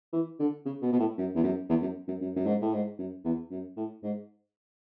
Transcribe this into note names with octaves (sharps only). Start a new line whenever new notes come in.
E3
D3
C#3
B2
B2
A2
F#2
E2
F#2
E2
F#2
F#2
F#2
F#2
G#2
A2
G#2
F#2
E2
F#2
A2
G#2